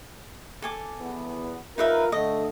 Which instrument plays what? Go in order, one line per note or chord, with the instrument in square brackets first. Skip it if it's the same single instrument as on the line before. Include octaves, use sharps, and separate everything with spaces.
[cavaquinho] A4 G#5 D6
[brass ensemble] E2 B3
[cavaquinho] D#4 B4 E5 [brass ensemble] F4 A#4
[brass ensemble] D3 A3 [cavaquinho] D#5